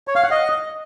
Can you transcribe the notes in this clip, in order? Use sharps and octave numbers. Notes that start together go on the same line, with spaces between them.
C#5
F5
F#5
D#5